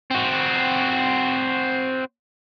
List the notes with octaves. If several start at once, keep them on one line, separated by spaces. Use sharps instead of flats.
C4 F#4